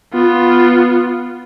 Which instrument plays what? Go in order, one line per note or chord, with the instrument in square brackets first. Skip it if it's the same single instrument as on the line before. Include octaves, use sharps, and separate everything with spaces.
[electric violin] B3 F4